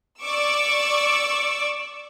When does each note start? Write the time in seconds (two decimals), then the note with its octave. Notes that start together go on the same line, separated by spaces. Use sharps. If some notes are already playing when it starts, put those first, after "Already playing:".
0.22 D5 C#6 D6 E6